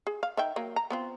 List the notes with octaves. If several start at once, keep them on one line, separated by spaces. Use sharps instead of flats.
G#4
F5
D#3 E5 G5
F#3 A#3
A#5
B3 C4 F4